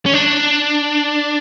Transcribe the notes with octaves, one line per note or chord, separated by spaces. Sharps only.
C#4
D4